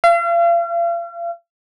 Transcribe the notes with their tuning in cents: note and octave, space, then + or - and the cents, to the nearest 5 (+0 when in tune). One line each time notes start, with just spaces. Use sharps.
F5 -40